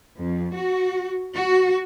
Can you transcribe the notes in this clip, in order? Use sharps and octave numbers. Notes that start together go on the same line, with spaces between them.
F2
F#4
F#4